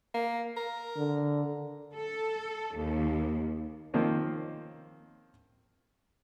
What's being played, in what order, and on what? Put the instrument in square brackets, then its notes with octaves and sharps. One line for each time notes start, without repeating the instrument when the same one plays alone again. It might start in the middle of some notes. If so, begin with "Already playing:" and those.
[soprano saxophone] A#3
A#4
[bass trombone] D3
[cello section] A4
D#2
[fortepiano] D#3 F3 A#3 C4 C#4